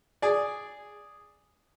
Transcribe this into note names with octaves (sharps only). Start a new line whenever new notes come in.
G#4 D5